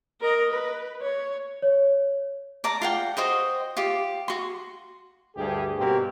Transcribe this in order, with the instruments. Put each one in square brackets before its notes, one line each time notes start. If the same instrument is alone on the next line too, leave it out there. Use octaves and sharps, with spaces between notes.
[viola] A#4 D#5
B4
C#5
[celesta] C#5
[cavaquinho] D5 A5 A#5
F4 F#5 G5
F#4 C5 D#5 G5
F4 G4
F#4 C6
[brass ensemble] D2 G2 G3 G4 G#4
G2 B2 A#3 C4 G4